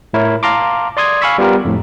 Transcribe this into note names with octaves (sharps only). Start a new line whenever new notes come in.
A2 E4 A#4 C#5
F5 A5 A#5 C6 D6
D5 C6 D#6 G#6
F5 G#5 B5 C#6 E6 B6
G3 B3 F4 G4 A#4
F2 A2